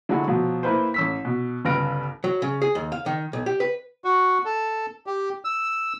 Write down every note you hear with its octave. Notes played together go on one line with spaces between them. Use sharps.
D3 F#3 G#3 E4 F#4
B2 F3 F#3
A#3 E4 B4 C5
A1 E6 B6
B2
G1 C#2 B4 F6 A#6 D7
F#3
C#3
G#4
D#2
F5
D#3
B1
G4
B4
F#4
A4
G4
E6